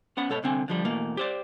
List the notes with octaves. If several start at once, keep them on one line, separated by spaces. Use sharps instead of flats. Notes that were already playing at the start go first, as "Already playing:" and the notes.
B3 C#4 F#5 B5
G#2 B2 A4 C#5 B5
C2 D3 C4 G#5
D3 F3 G3
B2 E3 A3 A#3
G4 C5 D5